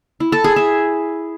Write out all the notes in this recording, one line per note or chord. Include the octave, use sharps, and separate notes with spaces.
E4
A4
G#4
E5